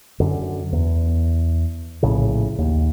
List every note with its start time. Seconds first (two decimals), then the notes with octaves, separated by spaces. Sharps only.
0.20 F#2 D3
0.72 E2
2.03 A#1 A2 C#3
2.58 D#2